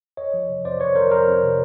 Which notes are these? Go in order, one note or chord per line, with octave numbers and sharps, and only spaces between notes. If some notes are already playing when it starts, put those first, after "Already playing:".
F2 C#5 D#5
F3
C3
F2 C5 D5
F2 B4 C#5
F3 A#4 C5
F2 A#4 C5
F2
C3